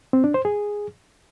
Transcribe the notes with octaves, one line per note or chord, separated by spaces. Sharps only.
C4
D4
C5
G#4